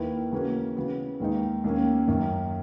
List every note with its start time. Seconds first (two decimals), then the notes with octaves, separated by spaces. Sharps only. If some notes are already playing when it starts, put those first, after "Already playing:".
Already playing: D#2 D#3 A#3 E4 B4
0.31 C#3 E3 A#3 C#4 F#4
0.76 C#3 E3 B3 F#4
1.20 D#2 D#3 G#3 D#4
1.64 D#2 D#3 A#3 C#4
2.07 F#2 D#3 A#3